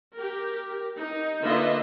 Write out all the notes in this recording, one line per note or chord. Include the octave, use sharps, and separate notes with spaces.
G4 A#4
D#4
D3 A#3 F4 B4 D#5 E5